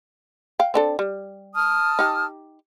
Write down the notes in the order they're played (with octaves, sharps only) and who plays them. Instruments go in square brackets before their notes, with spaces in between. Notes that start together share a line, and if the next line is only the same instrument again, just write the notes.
[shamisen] F5 G5
C4 D4 A4
G3
[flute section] A5 D#6 F6
[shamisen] D#4 G4